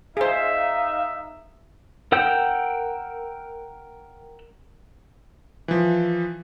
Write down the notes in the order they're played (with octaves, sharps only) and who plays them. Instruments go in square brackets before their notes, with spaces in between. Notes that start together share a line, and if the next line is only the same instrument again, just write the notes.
[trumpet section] D#4 E5 [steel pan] G#4 C5 [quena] F5
[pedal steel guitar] A#4 F#5 G5 E6 G6
[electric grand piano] E3 F3